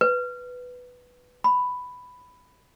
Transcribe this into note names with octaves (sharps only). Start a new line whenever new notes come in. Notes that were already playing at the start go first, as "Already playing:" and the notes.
B4
B5